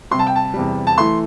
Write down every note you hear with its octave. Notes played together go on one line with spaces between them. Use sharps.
C3 G3 C6
A5
G5
A5
E2 C3 G3
A5
E3 A3 C6